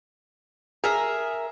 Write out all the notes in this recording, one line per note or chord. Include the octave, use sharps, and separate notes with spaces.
G#4 A#4 E5